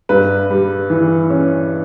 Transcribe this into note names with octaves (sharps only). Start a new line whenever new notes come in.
G2 B4
G3
E3
C#4